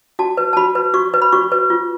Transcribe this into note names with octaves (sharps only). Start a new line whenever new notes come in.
F#4 A5
B4
A5
F#4 B5
B4
F#4 C#6
B4
B5
F#4 C#6
B4
F4